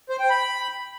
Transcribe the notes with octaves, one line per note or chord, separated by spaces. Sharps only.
C5
G5
B5